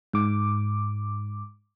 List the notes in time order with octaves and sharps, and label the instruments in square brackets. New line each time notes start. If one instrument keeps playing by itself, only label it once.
[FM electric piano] G#2 D6